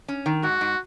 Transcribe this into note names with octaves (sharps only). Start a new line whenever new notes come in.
C#4
D#3
G#2 F#4
G#2